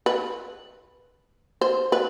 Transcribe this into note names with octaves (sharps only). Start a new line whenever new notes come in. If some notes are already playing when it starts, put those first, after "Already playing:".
B4
C5
B4